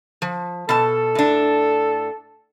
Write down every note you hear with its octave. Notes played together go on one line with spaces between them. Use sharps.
F3
B2 A4 A5
A2 D4